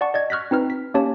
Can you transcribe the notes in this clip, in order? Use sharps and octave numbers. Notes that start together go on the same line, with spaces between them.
D5 F#5 A5 C#6
D5 D#5 G#6
C#6 F6 F#6 A#6 B6
C4 D#4 B4 F6
B6
A#3 C#4 G4 C#5 A5